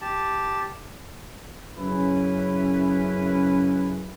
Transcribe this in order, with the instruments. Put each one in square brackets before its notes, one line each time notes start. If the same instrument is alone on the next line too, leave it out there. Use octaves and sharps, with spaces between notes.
[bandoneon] G4 A5
[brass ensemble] F#2 C#3 C#4 E4 B4